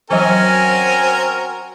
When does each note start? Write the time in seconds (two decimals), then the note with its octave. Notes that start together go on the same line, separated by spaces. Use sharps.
0.11 E3 F#3 C4 C#4 F#4 A#4 G#5